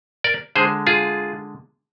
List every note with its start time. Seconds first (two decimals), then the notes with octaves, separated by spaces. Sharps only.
0.24 A#4 D5
0.55 D3 G#3 G#4 C5
0.87 F4 G#4